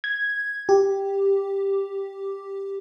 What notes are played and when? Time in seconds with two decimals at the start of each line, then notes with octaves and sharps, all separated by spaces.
0.04 G#6
0.69 G4